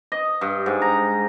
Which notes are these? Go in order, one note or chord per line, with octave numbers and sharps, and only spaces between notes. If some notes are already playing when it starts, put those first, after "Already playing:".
D#5
G2
G#2
A#5